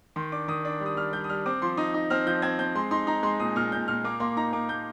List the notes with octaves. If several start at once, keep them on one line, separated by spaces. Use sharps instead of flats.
D#3 C6
D4 D6
D#3 D#6
D4 D6
G3
D#6
G3 F6
G3 G6
D#6
G3 F6
C4 D6
F3 C6
D#4 D#6
D#4
C4 F6
F3 G6
C4 G#6
C4 G6
G#3 C6
D#4 C6
D#4 A#5
G#3 C6
A#2 D#6
A#2 F6
A#2 G6
A#2 F6
A#3 D6
A#3 C6
D#4 A#5
A#3 D6
A#3 G6